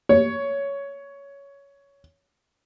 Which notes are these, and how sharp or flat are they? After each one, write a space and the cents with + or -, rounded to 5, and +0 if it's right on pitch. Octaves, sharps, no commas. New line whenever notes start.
C#5 +10